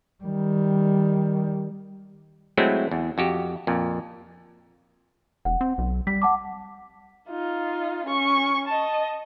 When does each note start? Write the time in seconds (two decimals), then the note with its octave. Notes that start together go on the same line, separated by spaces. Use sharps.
0.24 D#3 G3
2.57 F#3 G#3 A3 C4 E4 F#4
2.91 E2
3.18 F2 F#4 G4
3.67 F2 A#2
5.45 E1 F#5
5.61 C4
5.78 B1
6.07 G3 B6
6.22 F#5 A5 D6
7.29 D#4 F4
8.06 C#4 C#6
8.67 D#5 A5